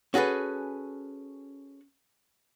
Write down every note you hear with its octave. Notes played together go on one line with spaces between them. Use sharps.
C#4 F#4 G#4 A4 B4